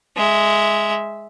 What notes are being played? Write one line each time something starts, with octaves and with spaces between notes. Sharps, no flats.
G#3 E5